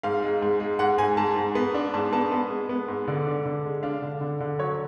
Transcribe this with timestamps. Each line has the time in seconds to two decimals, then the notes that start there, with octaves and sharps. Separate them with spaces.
0.03 G#2 F5
0.23 G#3
0.42 G#2
0.60 G#3
0.79 G#2 F#5
0.98 G#2 G#5
1.17 G#2 A5
1.36 G#2
1.55 B3
1.74 D4
1.94 G#2 A5
2.12 B3 A5
2.31 B3
2.50 G#3
2.69 B3
2.88 G#2
3.07 D3 D5
3.27 D4
3.46 D3
3.65 G#3
3.83 D4 F5
4.02 D3
4.21 D3
4.40 D3
4.59 F#3 C#5